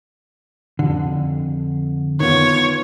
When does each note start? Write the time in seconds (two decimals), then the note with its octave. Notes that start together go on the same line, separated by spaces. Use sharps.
0.79 F2 D3
2.20 D#3 B3 F4 C#5